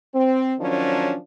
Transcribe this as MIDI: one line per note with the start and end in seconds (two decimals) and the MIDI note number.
0.14 0.53 60
0.59 1.16 51
0.59 1.16 53
0.59 1.16 54
0.59 1.16 61
0.59 1.16 62